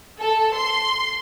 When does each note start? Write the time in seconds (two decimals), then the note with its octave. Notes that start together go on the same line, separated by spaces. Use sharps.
0.19 A4
0.55 C6